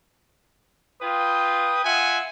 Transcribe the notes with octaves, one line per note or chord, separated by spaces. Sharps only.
F4 B4 G5 D#6
F4 E5 F#5 G#5